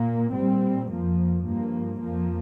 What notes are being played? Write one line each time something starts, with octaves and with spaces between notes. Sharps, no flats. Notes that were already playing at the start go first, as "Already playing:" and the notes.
Already playing: A#2 A#3
A#2 G3 C4
F2 F3 A#3
G2 F3 A#3
F2 F3 A#3